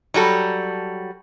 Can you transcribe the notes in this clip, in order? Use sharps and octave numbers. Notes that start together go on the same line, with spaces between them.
F#3 G3 F#4 A4